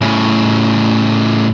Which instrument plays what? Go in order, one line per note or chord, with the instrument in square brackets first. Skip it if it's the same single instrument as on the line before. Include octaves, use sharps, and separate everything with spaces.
[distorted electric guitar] A2 C#3